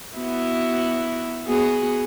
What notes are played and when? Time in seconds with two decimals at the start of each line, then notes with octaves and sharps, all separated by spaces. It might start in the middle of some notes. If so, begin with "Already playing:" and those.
0.16 B3 E4 F#4
1.47 B3 F#4 G#4